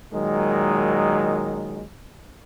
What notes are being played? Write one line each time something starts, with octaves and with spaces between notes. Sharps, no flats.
A#2 D#3 F#3 G#3